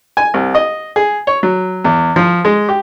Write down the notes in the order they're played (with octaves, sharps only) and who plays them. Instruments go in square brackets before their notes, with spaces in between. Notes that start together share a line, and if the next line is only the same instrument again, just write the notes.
[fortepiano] G#5
C2
D#5
G#4
C#5
F#3
E2
F3
G#3
G4